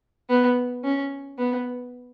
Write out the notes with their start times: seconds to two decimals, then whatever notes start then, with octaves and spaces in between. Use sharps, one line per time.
0.29 B3
0.84 C#4
1.38 B3